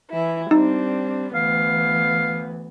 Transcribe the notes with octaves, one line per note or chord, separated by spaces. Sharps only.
E3 E4
G3 C4 D4 D#4
D2 E3 B3 F5